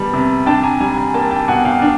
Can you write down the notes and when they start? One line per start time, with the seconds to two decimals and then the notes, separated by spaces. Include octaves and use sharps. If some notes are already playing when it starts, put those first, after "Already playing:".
Already playing: D#3 G3 B3 A5
0.13 C3
0.46 D4 G5 A5
0.63 G#5 A#5
0.80 G3 G#5 A#5
0.97 G#5 A#5
1.14 A#3 G5 A5
1.31 G5 A5
1.48 B2 F#5 G#5
1.65 F5 G5
1.82 D4